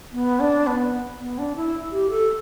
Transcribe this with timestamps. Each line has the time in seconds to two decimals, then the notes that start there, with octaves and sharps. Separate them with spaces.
0.13 B3
0.40 D4
0.67 B3
1.20 B3
1.38 D4
1.56 E4
1.92 G4
2.10 A4